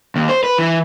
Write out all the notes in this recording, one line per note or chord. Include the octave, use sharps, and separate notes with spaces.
D#2
C5
B4
E3